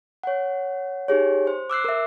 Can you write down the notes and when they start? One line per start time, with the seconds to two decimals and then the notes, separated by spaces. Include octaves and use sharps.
0.23 C#5 F#5
1.08 D#4 G4 G#4 C#5
1.47 C5
1.70 D6 E6 F#6 C7
1.84 A#4 E5